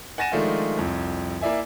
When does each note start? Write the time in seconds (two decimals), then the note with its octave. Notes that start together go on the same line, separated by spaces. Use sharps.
0.18 F#5 G#5 A6 A#6 D#7 E7
0.32 D#3 F3 G#3 A3 D4 F4
0.78 C2 F2
1.41 A#3 E4 D5 E5 G#5